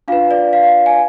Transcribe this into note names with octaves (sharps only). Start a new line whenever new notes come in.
D4 F4 B4 F5
D5
F5
F5
G#5